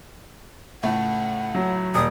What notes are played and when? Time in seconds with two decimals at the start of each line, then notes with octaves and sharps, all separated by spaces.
0.83 C#2 A2 A3 F#5
1.55 F#3
1.95 D#1 D#6